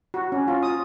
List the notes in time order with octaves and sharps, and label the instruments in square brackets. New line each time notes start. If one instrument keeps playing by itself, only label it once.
[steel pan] F#4
C#4
F4
D#6